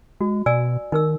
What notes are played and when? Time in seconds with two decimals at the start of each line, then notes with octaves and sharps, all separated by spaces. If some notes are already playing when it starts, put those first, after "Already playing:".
0.21 G#3 F#4
0.46 B2 D5 G#5 E6
0.92 D#3 D#4 A#4 E6